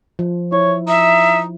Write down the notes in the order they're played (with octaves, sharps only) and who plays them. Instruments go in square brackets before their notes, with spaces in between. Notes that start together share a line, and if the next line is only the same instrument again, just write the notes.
[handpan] F3
[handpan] E4 [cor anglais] C#5
[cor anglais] D#4 [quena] E5